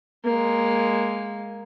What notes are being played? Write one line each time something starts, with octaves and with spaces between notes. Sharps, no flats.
G#3 A#3